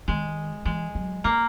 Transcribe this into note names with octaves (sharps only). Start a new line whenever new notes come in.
D#3 G#3
E3 G#3
F#3
G3 A#3